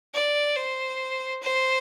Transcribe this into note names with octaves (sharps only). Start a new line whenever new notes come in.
D5
C5
C5